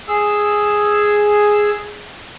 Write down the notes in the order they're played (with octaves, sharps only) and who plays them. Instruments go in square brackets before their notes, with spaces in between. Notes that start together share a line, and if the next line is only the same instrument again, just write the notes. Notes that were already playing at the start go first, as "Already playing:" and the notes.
[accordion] G#4 E6